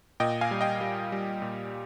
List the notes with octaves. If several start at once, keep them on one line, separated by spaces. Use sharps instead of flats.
A#2 D#5 G5
F5 G#5
G3
D#5 G5
G3
G3
A#2